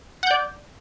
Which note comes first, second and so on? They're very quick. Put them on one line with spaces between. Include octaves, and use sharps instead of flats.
F#5 G6 D5